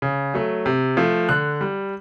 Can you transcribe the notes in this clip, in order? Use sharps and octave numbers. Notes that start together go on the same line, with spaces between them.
C#3
F#3 A3
C3
F3 A3
D3 F#6
G3